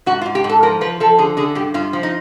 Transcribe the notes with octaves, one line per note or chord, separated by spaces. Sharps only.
G#2 F#4
F4
G#2
G4
G#2
A4
F3 A#4
F3 B4
F3 A4
D3 G#4
D3 G#4
G2 G4
G2 F4
F3
D#4